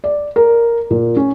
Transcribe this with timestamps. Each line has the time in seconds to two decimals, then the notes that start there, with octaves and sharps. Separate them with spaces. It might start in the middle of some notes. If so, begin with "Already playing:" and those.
0.04 D5
0.36 A#4
0.91 A#2
1.16 C#4